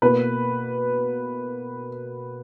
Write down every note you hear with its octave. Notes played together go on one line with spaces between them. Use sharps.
B2 A#3 B4